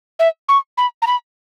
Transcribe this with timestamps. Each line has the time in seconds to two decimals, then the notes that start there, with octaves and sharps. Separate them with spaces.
0.19 E5
0.49 C#6
0.77 B5
1.02 A#5
1.07 B5